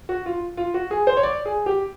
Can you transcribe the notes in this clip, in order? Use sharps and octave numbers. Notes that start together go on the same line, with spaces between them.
F#4
F4
F4
F#4
G#4
C5
C#5
D5
G#4
G4